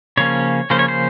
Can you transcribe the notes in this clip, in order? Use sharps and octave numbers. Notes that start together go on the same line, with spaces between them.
C#3 F3 A#3 C#4 C#5
C#3 F3 A#3 C#4 C5
C#5
C5